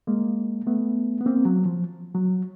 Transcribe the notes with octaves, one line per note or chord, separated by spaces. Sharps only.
G#3 A#3
A3 B3
B3
A#3 C4
F#3
F3
F#3